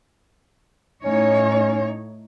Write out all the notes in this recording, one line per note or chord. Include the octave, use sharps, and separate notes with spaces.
A2 C#4 D#4 C#5